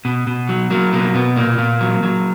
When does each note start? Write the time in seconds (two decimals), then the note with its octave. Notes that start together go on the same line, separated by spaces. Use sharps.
0.05 B2
0.27 B2
0.49 F#3
0.71 F#3 A#3
0.92 B2 A#3
1.15 B2 B3
1.36 A#2 A#3
1.58 A#2
1.81 F#3
2.03 F#3